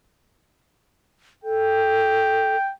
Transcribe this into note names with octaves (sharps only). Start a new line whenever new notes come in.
A4 G5